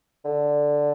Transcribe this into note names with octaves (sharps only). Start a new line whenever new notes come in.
D3